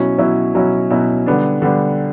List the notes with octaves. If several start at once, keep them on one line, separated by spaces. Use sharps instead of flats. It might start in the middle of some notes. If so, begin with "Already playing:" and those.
Already playing: B2 F#3 C#4 E4
B2 F#3 C#4 E4
B2 F#3 C#4 E4
B2 F#3 C#4 E4
D3 G3 B3 D4
D3 G3 B3 D4